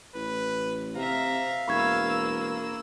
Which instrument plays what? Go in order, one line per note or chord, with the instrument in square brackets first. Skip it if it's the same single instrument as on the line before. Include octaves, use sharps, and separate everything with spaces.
[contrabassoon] A1 [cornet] B4
[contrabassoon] C3 [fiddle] E5 A#5 [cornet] F5
[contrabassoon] E1 [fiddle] A#3 E6 [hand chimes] B5 C#6 G#6